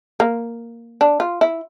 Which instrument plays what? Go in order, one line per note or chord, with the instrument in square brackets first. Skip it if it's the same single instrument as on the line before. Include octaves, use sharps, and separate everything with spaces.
[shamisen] A#3
D4
F4
E4